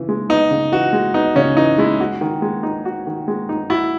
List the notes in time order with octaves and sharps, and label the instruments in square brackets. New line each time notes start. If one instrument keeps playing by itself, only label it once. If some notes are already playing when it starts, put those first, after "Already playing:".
Already playing: [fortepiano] C#3 E3
G#3
[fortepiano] B3 [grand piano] D#4
[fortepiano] C#3
[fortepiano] E3 [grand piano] F#4
[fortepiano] G#3
[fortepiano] B3 [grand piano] D#4
[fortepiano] C#3 [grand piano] C#4
[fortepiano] E3 [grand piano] D#4
[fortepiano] G#3 [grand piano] E4
[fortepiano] F#4
D#3
G#3
D#4
F#4
D#3
G#3
D#4
[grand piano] E4 [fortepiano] F#4